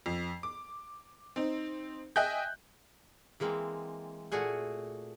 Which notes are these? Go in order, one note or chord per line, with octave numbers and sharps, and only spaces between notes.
F2
D6
C4 D#4
D#5 E5 G5 G#5 F#6 G6
E3 G#3 A#3 C4
A#2 A3 F#4 G#4 G#5